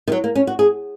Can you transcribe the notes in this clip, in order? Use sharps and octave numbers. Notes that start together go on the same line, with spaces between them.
D#3
F#3
A#3
C#4
F#4
G#4